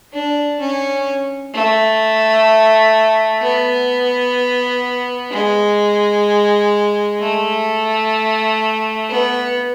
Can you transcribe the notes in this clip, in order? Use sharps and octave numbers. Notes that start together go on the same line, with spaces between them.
D4
C#4
A3
B3
G#3
A3
B3